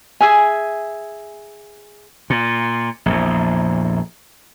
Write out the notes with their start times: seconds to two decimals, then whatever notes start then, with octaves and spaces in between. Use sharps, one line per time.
0.21 G#4 E5 G#5
2.30 A#2
3.06 A#1 E2